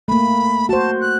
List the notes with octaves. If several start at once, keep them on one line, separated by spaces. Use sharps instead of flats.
A3 A#3 B5
F#4 C5 A5
F#6